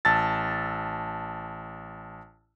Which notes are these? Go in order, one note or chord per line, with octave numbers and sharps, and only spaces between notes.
A1 A5 E6 A6